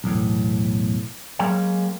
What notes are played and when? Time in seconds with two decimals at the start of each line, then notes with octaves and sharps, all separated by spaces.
0.04 B1 E2 A2
1.39 F#3 G#3 A#3 C#4 G5